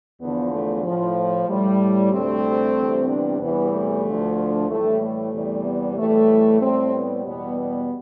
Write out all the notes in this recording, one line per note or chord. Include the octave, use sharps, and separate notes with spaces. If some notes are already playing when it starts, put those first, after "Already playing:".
E2 D3 F3 B3
A3
A2 F3
A2 G3
D2 C3 G3 A3 C4
D2 C3 E3 G3
B3 D4
E2 C3 E3 G3 B3
A3
D2 D3 F3
A2 E3 G3 A3
A3
E2 C3 E3 G3
B3
A2 E3 G3 A3
A2 G3 A3 C4
B3
E2 B2 G3 B3
B3